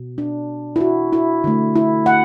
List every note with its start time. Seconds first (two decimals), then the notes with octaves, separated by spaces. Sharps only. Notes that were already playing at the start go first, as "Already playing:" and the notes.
Already playing: B2 B3
0.18 D4
0.76 E4
0.81 F#4
1.13 E4
1.44 D3 A3
1.76 E4
2.06 F#5